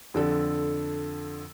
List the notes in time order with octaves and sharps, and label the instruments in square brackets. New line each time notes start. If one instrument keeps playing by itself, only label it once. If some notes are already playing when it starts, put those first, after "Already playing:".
[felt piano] F2 D3 A4